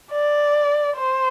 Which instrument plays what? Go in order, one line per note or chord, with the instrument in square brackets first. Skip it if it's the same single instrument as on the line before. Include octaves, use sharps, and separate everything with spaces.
[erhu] D5
C5